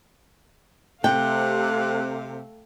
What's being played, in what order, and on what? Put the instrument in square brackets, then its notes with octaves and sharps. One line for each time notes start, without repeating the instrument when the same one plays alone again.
[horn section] C3 [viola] A3 F5 [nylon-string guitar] G5 [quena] F#6